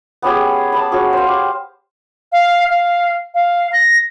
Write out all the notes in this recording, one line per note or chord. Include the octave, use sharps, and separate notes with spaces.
B3 C#4 G4 G#4
A5 B5
C#4 F#4 G#4
C5 F5
G4
F5
F5
F5
A#6